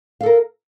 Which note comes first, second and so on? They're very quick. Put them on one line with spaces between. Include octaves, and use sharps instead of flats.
F5 A4 A#4